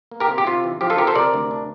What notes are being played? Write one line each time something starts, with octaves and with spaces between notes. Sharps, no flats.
A#3
G4 A#4
C3
G4
C3 F4
E3
F3 G4
F4 A4
C3 G4 A#4
A4 C5
C3 A#4 D5
D2
D4